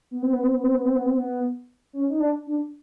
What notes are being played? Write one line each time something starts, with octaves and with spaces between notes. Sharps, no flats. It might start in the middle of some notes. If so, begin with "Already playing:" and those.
B3
C4
B3
C4
B3
C4
B3
C4
B3
C4
B3
C#4
D#4
D4
D4